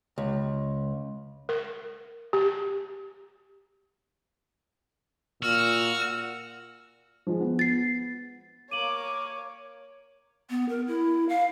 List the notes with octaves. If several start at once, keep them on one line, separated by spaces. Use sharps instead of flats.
C#2
A#4
G4
A#2 F#4 E6 F6
F3 G#3
B3
A6 C7
A#3 C#5 D6 D#7 F#7
B3
A#4
E4
F5